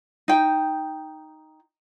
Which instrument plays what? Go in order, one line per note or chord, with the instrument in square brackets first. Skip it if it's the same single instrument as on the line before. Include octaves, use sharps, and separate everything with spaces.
[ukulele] D#4 G5